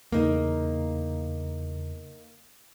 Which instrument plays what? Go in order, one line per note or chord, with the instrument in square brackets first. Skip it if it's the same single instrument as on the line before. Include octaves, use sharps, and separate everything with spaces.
[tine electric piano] E2 C#3 [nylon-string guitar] A#3 D#4